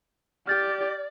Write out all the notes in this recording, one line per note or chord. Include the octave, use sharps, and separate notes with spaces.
G4 D5 F6 G6 A6